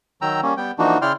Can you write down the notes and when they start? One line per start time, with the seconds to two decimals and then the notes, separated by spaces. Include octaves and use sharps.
0.22 D#3 F#3 G5 A#5 E6
0.43 G3 A#3 C#4
0.57 G3 B3 G5
0.79 E3 F3 A#3 D4 D#4 F#4
1.02 C#3 E4 D5 G5 C6 F6